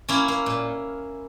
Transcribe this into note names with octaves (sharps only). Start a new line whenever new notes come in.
A#3 C#4 E4
A#3
A#2